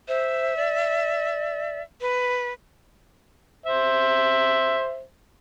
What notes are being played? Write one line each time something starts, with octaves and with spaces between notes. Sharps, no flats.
C5 E5
D5
B4
C5 E5